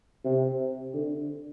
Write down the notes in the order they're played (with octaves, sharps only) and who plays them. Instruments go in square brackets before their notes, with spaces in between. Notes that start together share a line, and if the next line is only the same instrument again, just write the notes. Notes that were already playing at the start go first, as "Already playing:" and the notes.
[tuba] C3
D3